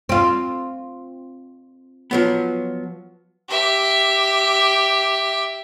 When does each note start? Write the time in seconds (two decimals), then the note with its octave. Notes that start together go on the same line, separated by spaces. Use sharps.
0.09 C4 F4
2.11 F3 F#3 B3
3.48 G4 E5